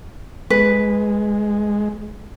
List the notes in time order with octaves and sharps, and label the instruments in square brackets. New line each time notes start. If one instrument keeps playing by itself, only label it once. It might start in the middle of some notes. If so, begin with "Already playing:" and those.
[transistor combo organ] G#3 [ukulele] B4